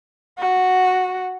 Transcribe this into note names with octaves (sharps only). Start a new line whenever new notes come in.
F#4